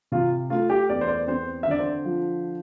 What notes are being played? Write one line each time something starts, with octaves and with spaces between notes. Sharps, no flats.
C3 F4
A3 F4
G4
E2 D5
C5
D5
C4 C5
E5
D3 D5
C5
F3